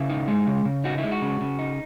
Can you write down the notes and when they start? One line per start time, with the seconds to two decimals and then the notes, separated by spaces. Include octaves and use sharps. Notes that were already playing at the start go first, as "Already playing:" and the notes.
Already playing: C#3 E4
0.10 D#4
0.28 G#3
0.47 C#3
0.65 C#3
0.84 D#4 F#4
0.98 E4
1.04 G#3
1.11 F#4
1.22 C#3
1.41 C#3
1.59 D#4